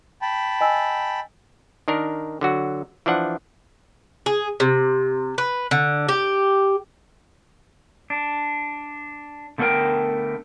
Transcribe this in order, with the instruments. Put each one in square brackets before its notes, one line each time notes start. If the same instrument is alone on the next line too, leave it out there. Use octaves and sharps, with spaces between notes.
[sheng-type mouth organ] G5 A5 B5
[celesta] D#5 G#5 E6
[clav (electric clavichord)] D#3 D4 A#4
D3 F#3 F#4
E3 F3 D4 F#5
[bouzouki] G#4
C3
B4
D3
G4
[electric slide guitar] D4
D3 A3 B3 G#4 A#4 G5